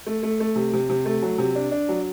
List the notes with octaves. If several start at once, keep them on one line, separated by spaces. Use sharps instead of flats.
A3
A3
A3
C3
C3
C3
A3
F#3
C3
D4
D4
F#3